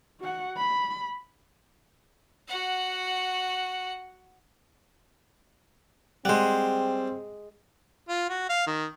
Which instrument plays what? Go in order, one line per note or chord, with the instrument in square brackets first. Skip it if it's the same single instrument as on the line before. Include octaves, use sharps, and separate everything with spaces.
[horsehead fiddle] F#4 F#5
B5
[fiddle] F#4 F#5
[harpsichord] G3 C5 [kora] G#3 F#5 [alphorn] C4
[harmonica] F4
F#4
F5
D#3